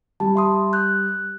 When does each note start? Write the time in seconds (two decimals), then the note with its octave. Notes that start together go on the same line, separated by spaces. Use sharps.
0.20 G3 A5
0.35 E5 C6 D#6
0.73 F#6 G6